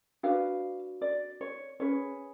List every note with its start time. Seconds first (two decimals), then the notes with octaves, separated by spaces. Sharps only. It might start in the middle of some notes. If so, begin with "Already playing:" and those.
0.23 D4 F#4 B4 F5
1.02 D5
1.41 C#5
1.80 C#4 G#4 B4 C#5